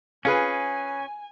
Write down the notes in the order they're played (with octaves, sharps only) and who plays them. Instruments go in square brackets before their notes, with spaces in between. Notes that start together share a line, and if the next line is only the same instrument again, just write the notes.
[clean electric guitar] C#4 [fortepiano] F4 G#4 B4 [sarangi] G#5